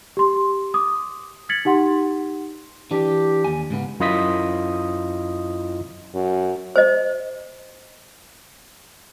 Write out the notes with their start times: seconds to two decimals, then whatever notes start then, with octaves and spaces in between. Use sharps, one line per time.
0.17 G4 C6
0.74 D6 D#6
1.49 F6 G#6 A6 B6 C#7 F#7
1.65 D#4 G4 F#5 C6
2.91 E3 D4 G4
3.44 D#2 G#5
3.70 G#2 C#3 B3
4.00 F#2 E4 F4 D#5 D#6 B6
6.14 F#2
6.76 C5 D#5